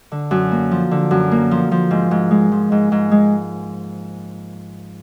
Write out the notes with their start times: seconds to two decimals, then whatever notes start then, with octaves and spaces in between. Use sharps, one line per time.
0.12 D3
0.31 F#2
0.52 A#3
0.71 F3
0.91 D3
1.11 F#2
1.31 A#3
1.51 F3
1.71 F3
1.91 G#2
2.11 G#2
2.31 G#3
2.51 F3
2.72 G#2
2.92 G#2
3.11 G#3